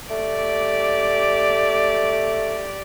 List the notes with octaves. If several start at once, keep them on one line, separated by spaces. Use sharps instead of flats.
A3 G4 D5